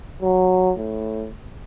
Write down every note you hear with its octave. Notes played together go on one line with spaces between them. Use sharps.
F#3
A2